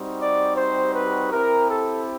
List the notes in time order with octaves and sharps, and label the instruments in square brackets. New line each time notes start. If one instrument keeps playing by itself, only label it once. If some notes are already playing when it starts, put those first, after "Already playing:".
Already playing: [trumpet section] G3 C4 D#4 F#4
D5
C5
B4
C4 E4 G4 A#4
A4